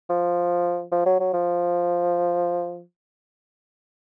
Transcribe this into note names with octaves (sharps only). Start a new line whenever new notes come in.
F3
F3
F#3
F#3
F3